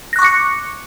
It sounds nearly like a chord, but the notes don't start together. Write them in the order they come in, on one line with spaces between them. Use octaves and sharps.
A#6 F#6 C#6 D6 C#7